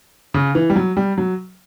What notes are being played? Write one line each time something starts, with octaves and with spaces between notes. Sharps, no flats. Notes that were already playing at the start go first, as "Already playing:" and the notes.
C#3
E3
G3
F#3
G3
F#3